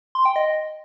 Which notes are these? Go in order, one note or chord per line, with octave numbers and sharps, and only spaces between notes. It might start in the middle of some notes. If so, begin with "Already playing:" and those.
C6
G5
D#5